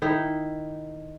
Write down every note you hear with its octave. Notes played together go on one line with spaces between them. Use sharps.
D#3 D#4 E4